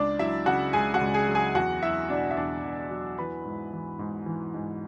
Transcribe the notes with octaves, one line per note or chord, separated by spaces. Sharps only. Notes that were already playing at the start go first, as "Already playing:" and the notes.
Already playing: C#2 D4 D5
F#3 E4 E5
C#3 F#4 F#5
C#2 G#4 G#5
F#4 F#5
C#2
G#4 G#5
F#3
G#4 G#5
E2 F#4 F#5
F#3 E4 E5
B2 D4 D5
E5
E2 D4 D5
E2
F#3
E3 B4 B5
G#2
E3
G#2
E3
G#2